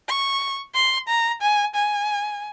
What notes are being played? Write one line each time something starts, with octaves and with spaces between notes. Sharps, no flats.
C#6
C6
A#5
G#5
G#5